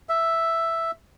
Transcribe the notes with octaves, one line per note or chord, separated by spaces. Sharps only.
E5